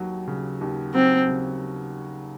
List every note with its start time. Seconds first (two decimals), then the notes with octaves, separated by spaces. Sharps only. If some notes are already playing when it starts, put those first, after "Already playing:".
Already playing: D#2 F#3
0.28 C#3
0.61 D#2
0.95 F#3 C4
1.28 C#3